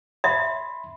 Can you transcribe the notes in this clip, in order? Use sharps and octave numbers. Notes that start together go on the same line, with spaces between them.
E5 B5 C6